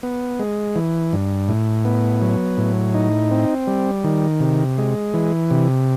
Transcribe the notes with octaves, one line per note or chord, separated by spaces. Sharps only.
B3
G#3
E3
G2
A2
B3
F#3
A2
D#4
C4
G3
D#3
C3
G#3
E3
C3